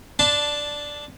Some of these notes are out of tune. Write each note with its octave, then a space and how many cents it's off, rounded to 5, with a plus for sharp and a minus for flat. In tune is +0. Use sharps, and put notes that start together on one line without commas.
D4 +0 A5 -5 C6 -40